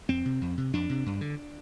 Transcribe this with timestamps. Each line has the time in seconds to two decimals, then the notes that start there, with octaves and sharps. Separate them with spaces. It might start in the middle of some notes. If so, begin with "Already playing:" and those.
0.09 F2 C4
0.25 C3
0.41 F2
0.57 C3
0.73 F2 D4
0.89 C3
1.06 G2
1.21 D3